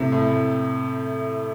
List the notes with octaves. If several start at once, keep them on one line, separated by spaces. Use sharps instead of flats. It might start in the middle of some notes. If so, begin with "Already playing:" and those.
Already playing: A2 C3
A2
A2